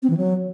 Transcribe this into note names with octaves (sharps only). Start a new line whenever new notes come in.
C4
E3
F#3